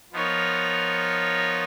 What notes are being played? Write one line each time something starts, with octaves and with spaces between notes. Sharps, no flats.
F3 B3 D#4 A#4 C#5